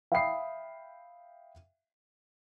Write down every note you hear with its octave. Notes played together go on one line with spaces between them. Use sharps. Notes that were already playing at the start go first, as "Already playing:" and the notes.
E5 F5 G5 B5 D#6 C7